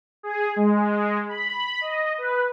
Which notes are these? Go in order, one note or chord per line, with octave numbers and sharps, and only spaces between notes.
G#4
G#3
B5
D#5
B4